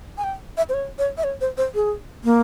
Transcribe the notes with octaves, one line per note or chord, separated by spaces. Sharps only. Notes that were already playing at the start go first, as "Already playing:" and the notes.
G#5
G5
E5
C5
C#5
C#5
E5
C#5
C5
C5
G#4
A#3